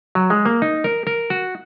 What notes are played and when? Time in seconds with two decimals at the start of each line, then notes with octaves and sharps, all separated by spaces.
0.15 F#3
0.30 G#3
0.45 A#3
0.62 D#4
0.84 A#4
1.07 A#4
1.30 F#4